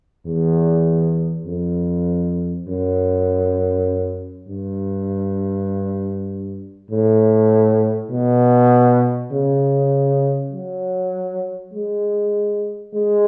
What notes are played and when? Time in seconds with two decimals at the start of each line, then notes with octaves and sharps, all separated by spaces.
0.26 E2
1.46 F2
2.68 F#2
4.48 G2
6.91 A2
8.11 B2
9.32 C#3
10.53 F#3
11.74 G#3
12.94 G#3